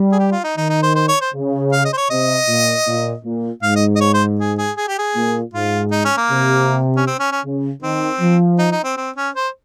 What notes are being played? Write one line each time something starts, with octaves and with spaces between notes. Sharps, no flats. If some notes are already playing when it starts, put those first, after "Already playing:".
Already playing: G3
G#4
G4
F4
D#4
D#3 D#4
D#4
C5
C5
C#5
C5
C#3
F5
D#5
C5
C#5
C3 D#5
A#2
A#2
A#2
G#2 F5
D#5
D#5
C#5
C5
G#4
G#4
G#4
G4
G#4
A#2
G#2 F4
D#4
C#4
A#3
C3
C#4
C4
C#4
C#4
C#3
D#3 C4
F3
D#4
D#4
C4
C4
C#4
C5